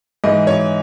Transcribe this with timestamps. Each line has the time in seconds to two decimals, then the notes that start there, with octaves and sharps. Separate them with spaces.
0.24 G#2 E3 D#5
0.47 C#5